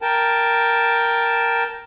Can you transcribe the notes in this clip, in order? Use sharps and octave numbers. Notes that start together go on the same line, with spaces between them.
A#4 G5 A5